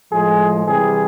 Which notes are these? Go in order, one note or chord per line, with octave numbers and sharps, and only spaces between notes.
A2 F3 G#3 G#4
C3 E3 G3 G#4